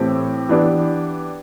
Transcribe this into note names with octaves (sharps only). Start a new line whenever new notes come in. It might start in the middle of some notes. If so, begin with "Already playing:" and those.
Already playing: A2 E3 A3 C4 G4
E3 B3 D4 G4